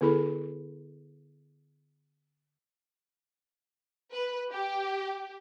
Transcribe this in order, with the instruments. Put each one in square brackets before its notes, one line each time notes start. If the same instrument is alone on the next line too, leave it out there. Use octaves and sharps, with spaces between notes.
[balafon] D3 B3 E4 G#4 A4 B5
[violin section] B4
G4